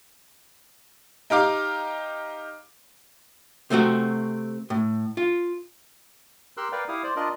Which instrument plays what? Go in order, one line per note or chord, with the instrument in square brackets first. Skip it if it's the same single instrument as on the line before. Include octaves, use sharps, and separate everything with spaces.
[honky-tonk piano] D#4 G4 F5 D6
[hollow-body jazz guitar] C3 A3 C4 F#4
A2
F4
[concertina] G4 A#4 C6 E6 F#6
A#4 B4 D5 F5 G5
E4 G4 F5 D#6
C5 D5
D4 F4 A#4 D5 D#5